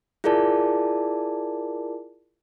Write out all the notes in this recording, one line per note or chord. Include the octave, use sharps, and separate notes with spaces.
E4 F4 G#4 A#4 D5 A5